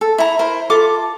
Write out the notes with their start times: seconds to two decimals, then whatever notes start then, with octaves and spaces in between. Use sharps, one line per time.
0.01 A4
0.18 E4 A#5
0.39 E4 A#4 C5
0.70 F4 A4 D6